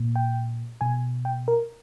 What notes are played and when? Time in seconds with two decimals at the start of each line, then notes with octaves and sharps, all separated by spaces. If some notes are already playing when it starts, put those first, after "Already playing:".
Already playing: A#2
0.16 G5
0.81 B2 G#5
1.25 G5
1.48 A#4